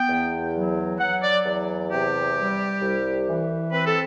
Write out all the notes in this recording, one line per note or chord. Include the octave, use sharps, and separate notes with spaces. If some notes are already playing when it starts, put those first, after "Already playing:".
Already playing: B3 G5
E2
F#3
F#3 F#5
D5
E2
C3 G4
G3
C2
E3
C4 B4
A4